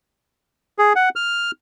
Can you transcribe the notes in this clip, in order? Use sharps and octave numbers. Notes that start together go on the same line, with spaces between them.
G#4
F#5
F6